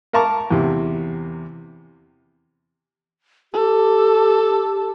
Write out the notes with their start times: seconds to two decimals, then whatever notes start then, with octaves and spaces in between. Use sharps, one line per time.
0.13 A#4 F5 A5 A#5 C#6 D6
0.51 E2 C3
3.53 G4 A4